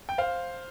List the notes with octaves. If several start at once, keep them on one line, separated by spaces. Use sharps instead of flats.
G5
C5 F5